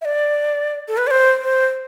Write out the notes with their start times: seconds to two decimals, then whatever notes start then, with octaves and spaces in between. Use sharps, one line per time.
0.01 E5
0.05 D5
0.88 A4
0.97 B4
1.07 D5
1.11 C5
1.42 C5